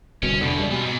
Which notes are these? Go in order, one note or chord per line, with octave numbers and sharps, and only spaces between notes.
D1 C2 B2 C#4
E1 E2 B2 D3
C#2 G3
B2 E3 F3
G#2